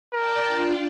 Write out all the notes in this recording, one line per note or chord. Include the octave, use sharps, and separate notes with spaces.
A#4 D5 G5 A5
D4 F4